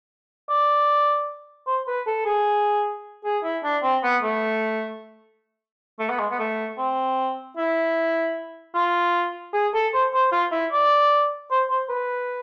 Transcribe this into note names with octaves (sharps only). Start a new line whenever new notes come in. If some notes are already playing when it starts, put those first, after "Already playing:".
D5
C5
B4
A4
G#4
G#4
E4
D4
C4
B3
A3
A3
B3
G#3
B3
A3
C4
E4
F4
G#4
A4
C5
C5
F4
E4
D5
C5
C5
B4